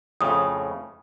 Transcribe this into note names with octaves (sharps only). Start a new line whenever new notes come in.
F2 A2 C#3 D#6